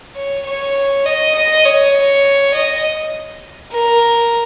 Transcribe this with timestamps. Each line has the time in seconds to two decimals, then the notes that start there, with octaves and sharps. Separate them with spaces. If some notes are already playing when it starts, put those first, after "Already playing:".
0.15 C#5
0.45 C#5
1.05 D#5
1.35 D#5
1.65 C#5
2.54 D#5
3.73 A#4